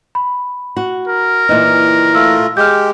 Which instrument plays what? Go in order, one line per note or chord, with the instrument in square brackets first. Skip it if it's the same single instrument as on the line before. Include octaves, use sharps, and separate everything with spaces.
[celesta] B5
[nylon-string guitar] F#4
[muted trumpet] A#4
[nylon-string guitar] A#2 E3 D#4 [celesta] B4 D#5
[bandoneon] A3 F4 [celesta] E6 A#6
[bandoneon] G#3 G4 [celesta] F6 G6